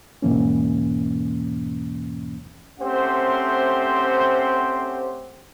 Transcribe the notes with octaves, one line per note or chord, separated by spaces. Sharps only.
E2 G#2 B2 E3 A#3 C#4
A3 C4 C#4 G4 C5 F#5